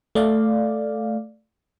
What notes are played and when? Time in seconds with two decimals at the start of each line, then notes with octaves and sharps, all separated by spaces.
0.15 A3 D5 F5